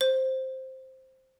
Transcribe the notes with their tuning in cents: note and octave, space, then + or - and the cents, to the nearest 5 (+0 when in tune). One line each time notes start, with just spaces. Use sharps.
C5 +5